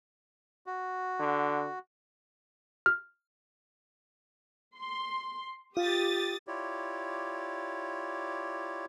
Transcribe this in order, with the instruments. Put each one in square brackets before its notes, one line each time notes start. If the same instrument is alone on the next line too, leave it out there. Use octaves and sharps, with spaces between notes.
[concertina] F#4
[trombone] D3
[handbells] F6
[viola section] C6
[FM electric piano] F4 [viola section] G4 [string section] D#6 A6
[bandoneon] E4 F4 G4 C#5 D5